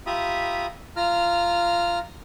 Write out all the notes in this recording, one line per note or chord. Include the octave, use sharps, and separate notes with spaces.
F4 G4 E5 A#5 B5 D#6
F4 A#5 F6